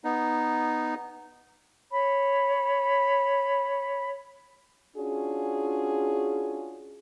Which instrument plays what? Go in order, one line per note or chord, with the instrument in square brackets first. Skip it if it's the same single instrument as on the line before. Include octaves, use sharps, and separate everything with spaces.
[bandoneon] B3 D#4
[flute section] C#5 B5
[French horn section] C#4 D4 F4 F#4 G#4